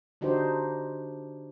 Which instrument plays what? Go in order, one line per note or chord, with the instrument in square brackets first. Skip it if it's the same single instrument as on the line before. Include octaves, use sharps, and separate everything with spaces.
[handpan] D3 D4 D#4 F#4 G4 C5